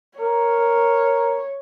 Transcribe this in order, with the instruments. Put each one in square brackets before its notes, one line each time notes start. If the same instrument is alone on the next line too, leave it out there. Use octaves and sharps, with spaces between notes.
[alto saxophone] A#4 [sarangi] C#5